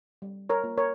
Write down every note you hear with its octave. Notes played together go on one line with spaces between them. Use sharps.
G3
A#4 C#5
A#3 F4
A#4 C#5